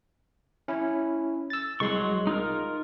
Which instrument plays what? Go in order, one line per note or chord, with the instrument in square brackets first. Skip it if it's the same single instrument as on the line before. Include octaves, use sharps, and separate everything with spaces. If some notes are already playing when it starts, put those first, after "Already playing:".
[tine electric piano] C#4 E4
E6 A6
[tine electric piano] C2 G#3 C6 [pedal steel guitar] F#3 C#6
[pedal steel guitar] D#4 F4 A#4